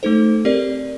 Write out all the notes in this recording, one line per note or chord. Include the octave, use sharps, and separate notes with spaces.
A3 D#4 A4 C5
C4 G4 A#4 D5